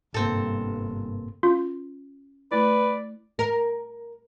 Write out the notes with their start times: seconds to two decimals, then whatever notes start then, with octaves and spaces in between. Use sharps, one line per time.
0.14 G1 G#2 C3 A#3 C4 A4
1.43 C#4 F4
2.52 A3 E4 B4 D5
3.39 A#4